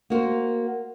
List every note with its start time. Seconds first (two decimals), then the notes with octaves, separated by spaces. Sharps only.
0.10 A#3 F#4 A#4 C5